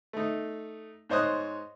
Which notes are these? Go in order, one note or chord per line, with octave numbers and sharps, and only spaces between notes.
A3 D#4
G#2 C5 C#5 D#5 D#6 F#6